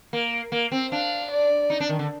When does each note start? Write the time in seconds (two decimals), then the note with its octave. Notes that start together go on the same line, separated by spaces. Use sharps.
0.13 A#3
0.52 A#3
0.72 C4
0.91 D4 F5
1.31 D5
1.70 D#4
1.80 D4
1.89 D#3
1.99 D3